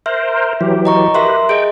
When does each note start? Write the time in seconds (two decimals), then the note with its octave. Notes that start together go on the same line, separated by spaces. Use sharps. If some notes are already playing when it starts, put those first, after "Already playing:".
0.06 A#4 C5 E5
0.61 E3 F#3 G4
0.85 D#5 A#5 C#6
1.15 G4 A#4 B4 E5 C6
1.49 G#4 D#5 G5